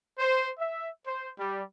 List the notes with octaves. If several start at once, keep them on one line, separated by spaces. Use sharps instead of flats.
C5
E5
C5
G3